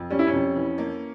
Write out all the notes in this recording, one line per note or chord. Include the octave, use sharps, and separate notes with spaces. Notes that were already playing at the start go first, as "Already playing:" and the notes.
Already playing: F2
G3 C#4
E4
C#4
F2
E3
A#3